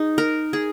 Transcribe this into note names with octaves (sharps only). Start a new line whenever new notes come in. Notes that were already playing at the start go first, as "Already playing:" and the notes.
Already playing: D#4 G#4
A#4
G#4